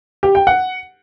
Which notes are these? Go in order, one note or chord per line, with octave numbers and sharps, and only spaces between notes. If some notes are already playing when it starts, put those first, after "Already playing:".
G4
G5
F#5